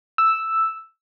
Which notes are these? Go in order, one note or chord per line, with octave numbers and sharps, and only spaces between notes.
E6